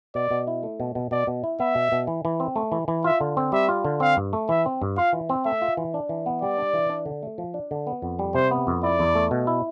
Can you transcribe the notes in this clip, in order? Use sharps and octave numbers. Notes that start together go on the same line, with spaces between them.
B2 D5
B2
E4
A3
B2
B2
B2 D5
B2
E4
B3 E5
B2
B2
E3
E3
C4
A3
E3
E3
F4 E5
D3
C4
G3 E5
F4
D3
C4 F5
G2
A3
E3 E5
C4
G2
F4 F5
E3
C4
A3 E5
F4
E3
D4
E3
B3
G3 D5
D4
E3
D4
D3
A3
F3
D4
D3
B3
F2
G3
C3 C5
B3
F2
E4 D5
E2
A3
B2
E4